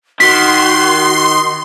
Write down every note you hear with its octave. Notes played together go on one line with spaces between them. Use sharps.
D#3 F#4 C6 B6